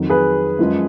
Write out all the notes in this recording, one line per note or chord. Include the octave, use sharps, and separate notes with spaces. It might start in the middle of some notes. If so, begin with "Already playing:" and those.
Already playing: F2 D#3 F#3
G#4 B4
F#2 F3 G#3